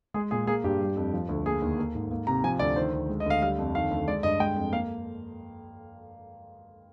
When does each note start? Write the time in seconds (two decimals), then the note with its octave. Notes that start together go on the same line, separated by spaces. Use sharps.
0.14 G#3 G#4
0.31 A#2 G#4
0.47 A#3 G#4
0.64 G2 G4
0.80 G3
0.96 F2
1.13 F3
1.29 D2
1.46 A#3 G#4
1.62 D#2
1.79 A#3
1.95 G#2
2.11 A#3
2.27 C3 A#5
2.44 F3 G#5
2.59 D2 D5
2.76 D#3 C5
2.93 D2
3.09 G#3
3.20 D#5
3.26 D2 F5
3.42 G3 F5
3.58 F2
3.75 D#3 F5
3.91 D2
4.07 G#3 D5
4.23 G2 D#5
4.40 G#3 G5
4.56 F2
4.72 A#3 F5